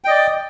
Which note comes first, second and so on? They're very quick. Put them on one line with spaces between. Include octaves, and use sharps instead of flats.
G5 D#5 D5